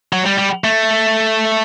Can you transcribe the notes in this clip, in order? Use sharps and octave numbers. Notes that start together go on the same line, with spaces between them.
F#3
G3
G3
A3